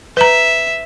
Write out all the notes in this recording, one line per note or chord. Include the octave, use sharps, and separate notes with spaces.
B4 E5 A#5